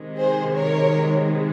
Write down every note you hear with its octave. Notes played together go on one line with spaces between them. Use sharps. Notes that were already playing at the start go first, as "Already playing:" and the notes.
Already playing: C3 D#3 G#3
G#4 C5
A#4 C#5